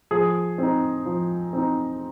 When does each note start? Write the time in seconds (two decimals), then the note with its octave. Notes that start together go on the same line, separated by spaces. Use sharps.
0.11 F3 G#4
0.58 C4 D#4
1.06 F3
1.53 C4 D#4